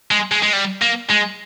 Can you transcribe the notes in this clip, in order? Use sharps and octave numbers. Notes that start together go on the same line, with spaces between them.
G#3
G#3
G#3
G3
A#3
G#3